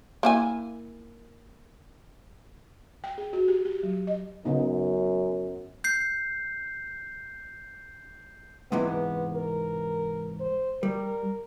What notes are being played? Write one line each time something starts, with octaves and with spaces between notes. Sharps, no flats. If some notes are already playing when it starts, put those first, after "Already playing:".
A#3 E4 G#5
G5
G#4
F#4
G4
G4
F#3
D#5
F#2 C#3 B3 D#4
G6 C7
G#2 C3 E3 B3
A#4
C5
G3 A#4